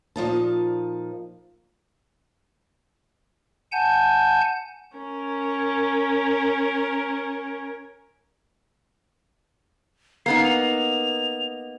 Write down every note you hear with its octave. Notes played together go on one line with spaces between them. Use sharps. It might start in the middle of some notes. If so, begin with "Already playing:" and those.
A#2 F3 D#4 A5
F#5 G#5 A5 G6
C#4 A#4
A#3 B3 D#4 C7
F7